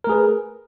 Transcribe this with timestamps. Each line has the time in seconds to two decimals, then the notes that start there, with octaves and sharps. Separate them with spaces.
0.04 A#4
0.07 A3
0.09 G#4
0.12 B4